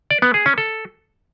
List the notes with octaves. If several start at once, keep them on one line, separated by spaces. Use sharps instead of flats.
D5
B3
G#4
C#4
A4